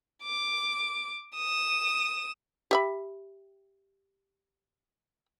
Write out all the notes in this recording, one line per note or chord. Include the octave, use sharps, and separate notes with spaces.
D6
D#6 E7
G4 E5 B5